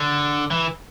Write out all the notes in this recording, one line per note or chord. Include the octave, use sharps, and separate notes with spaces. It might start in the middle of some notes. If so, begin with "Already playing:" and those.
Already playing: D3
E3